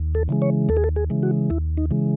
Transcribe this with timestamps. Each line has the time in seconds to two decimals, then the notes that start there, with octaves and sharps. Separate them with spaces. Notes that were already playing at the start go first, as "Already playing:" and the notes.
Already playing: D#2
0.15 A4
0.29 C#3 E3 G#3
0.42 C#5
0.69 D#2 A4
0.77 G#4
0.84 A4
0.96 G#4
1.10 C#3 E3 G#3
1.23 F#4
1.50 D#2 E4
1.77 D#4
1.91 C#3 E3 G#3